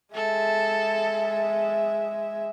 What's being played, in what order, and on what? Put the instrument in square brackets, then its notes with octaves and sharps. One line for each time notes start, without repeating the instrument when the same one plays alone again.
[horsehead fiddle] G#3 E5 [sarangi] A4